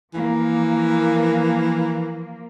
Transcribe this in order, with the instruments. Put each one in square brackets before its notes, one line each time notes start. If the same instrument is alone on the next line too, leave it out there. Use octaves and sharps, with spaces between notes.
[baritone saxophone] E3 [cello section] F3 A#3